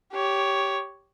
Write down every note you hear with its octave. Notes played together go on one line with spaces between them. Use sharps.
G4 C#5